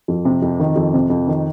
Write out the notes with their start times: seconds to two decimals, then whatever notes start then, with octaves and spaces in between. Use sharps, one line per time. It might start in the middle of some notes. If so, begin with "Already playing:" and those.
0.08 F2
0.25 C3
0.42 F2
0.60 D#3
0.76 F2
0.94 C3
1.10 F2
1.27 D#3